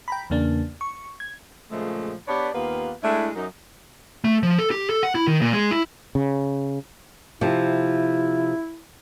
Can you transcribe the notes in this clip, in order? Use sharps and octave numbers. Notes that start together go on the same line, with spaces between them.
G5 A#5 B5
E2 C#3 A#3 D4
C#6
G#6
A#2 C#3 F3 G#3 A3
B3 D4 G4 B4 C#5 D5
D#2 A#3 B3 F4 G4 B4
G#3 A3 D4 E4
F#2 D#4
A3
F3
A4
G4
A4
F#5
E4
D#3
A#2
G#3
E4
C#3
C3 F3 C4 E4